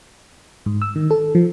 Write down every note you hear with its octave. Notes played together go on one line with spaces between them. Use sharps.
G#2
E6
D#3
A4
F3